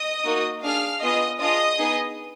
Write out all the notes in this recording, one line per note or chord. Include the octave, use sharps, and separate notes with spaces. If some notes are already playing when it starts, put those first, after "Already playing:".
Already playing: D#5 D#6
A#3 D#4 F#4
D4 G#4 F5 F6
B3 F4 G#4 D#5 D#6
D4 F4 G#4 D#5 D#6
B3 D#4 G#4